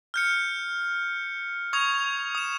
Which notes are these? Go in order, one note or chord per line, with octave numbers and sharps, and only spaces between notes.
F6 G6 C#7
C#6 D#6 G#6 F7
D#6 E7